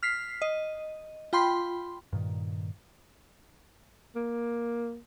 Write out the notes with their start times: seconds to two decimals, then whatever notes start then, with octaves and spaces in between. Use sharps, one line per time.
0.03 F6 B6 C7
0.42 D#5
1.33 F4 G5 B5 C6
2.13 G2 A#2 D#3
4.16 A#3